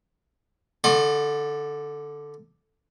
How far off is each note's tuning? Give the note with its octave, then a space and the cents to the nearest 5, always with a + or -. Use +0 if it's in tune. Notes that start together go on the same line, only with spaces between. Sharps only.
D3 +0 D5 +45 C#6 -35